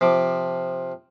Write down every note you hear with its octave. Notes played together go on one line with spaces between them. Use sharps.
C3 F3 D6